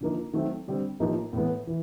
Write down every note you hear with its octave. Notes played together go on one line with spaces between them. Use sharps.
D3 F3 A#3 D#4
D#3 F#3 A3 C4
D3 G3 C4
A2 F3 A#3 D#4 G4
A2 E3 G#3 B3
E3